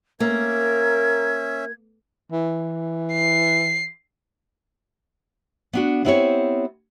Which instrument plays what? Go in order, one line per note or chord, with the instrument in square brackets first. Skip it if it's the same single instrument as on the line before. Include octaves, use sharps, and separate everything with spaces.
[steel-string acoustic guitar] A#3 [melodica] C#4 E5 [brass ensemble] A#4 [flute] G#6
[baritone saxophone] E3
[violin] C7
[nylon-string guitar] B3 D4 F#4
B3 C4 E4 G4 G#4 C#5